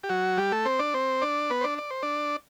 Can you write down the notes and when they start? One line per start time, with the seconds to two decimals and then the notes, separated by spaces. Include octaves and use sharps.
0.04 G4
0.09 F#3 F#4
0.37 G3 G4
0.52 A3 A4
0.65 C4 C5
0.79 D4 D5
0.94 C4 C5
1.22 D4 D5
1.50 B3 B4
1.61 C5
1.64 D4 D5
1.78 D5
1.91 C5
2.03 D4 D5